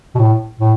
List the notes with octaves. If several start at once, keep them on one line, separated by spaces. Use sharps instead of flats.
B2
A2
A2